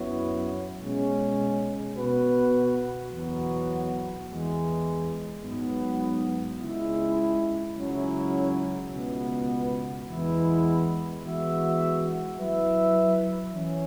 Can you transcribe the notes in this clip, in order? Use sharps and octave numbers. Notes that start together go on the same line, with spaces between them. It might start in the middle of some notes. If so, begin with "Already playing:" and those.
Already playing: F#2 F#3 B3 E4 C#5
B2 G#3 C#4
B2 B3 F#4 B4
E2 B2 F#3 B3 F#4
E2 E3 G#3
G#2 F#3 B3
C#2 C#3 G#3 E4
C#2 C#3 F#3 C#4 E4
C#2 B2 B3
E2 E3 G#3 B3 E4
E3 G#3 B3 F#4 E5
F#3 E4 B4 E5
E3 C#4